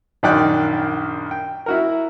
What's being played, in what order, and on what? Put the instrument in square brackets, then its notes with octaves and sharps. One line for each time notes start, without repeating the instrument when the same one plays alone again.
[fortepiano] A#1 F#2 D#3 D5 G5 F#6
G5
E4 F#4 A#4